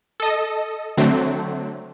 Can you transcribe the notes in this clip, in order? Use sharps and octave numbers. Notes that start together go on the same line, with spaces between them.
A4 D#5
D3 F#3 A3 C4